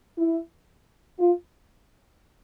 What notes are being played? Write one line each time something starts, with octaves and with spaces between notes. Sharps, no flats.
E4
F4